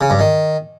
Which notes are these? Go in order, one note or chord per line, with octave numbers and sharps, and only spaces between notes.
C#3
G2
D#3